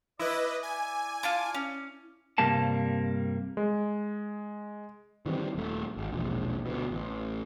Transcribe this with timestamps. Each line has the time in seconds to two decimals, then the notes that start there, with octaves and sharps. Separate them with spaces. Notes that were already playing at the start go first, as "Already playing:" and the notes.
0.19 E4 B4 D5 D#5
0.63 G#5
1.23 F4 A5 D6
1.54 C#4
2.38 C2 G2 C3 G3 A#3 A5
3.57 G#3
5.26 D#3 E3 G3 C4
5.55 D#1 A3
5.97 G#1
6.12 E1 A#1
6.65 D2 B2
6.91 A1